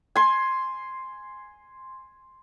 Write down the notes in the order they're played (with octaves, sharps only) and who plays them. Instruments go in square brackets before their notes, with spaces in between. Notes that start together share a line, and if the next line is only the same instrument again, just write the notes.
[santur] G#5 C6